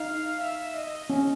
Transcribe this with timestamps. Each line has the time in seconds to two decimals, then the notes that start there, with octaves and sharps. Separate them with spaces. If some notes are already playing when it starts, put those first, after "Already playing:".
Already playing: D#4 F5
0.42 E5
0.76 D#5
1.10 C#4